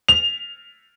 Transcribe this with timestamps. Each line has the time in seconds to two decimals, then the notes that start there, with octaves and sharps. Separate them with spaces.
0.08 F7